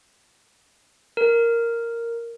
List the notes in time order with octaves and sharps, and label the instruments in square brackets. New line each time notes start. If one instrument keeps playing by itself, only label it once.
[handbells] A#4